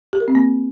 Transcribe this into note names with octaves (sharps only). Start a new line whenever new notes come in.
G4
A#4
C4
A#3